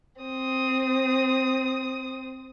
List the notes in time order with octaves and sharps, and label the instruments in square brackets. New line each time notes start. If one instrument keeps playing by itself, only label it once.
[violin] C4 D#6